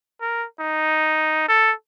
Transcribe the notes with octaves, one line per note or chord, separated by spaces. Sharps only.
A#4
D#4
A4